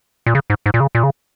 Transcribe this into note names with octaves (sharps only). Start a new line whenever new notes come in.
A#2
C#3
G#2
G#2
A#2
C#3
A#2
C#3